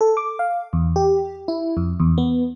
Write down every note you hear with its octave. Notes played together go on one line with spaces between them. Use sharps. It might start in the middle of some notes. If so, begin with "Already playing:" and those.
A4
D6
F5
E2
G4
E4
F2
E2
B3